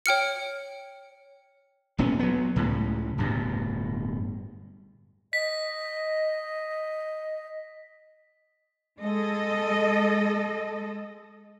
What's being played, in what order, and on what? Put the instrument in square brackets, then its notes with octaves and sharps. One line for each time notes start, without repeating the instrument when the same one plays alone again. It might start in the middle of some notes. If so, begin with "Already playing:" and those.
[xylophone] C#5 G5 F6 C#7
[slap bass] E1 A#2 B3 C#4
F#3 B3
C#2 A2 C#3
D1 G2 B2
[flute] D#5 [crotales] B6
[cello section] G#3 A4 D#5